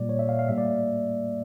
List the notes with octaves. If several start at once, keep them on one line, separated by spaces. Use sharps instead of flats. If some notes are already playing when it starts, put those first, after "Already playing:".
Already playing: A#2 G3 A#3 D5
C#5
E5
F5
F5
A2 G3 A#3 E5
D5